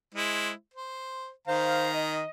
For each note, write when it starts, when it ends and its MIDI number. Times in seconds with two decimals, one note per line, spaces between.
0.15 0.51 56
0.15 0.51 64
0.15 0.51 72
0.74 1.30 72
1.48 2.22 51
1.48 1.88 72
1.48 1.88 77
1.48 2.22 82
1.94 2.30 75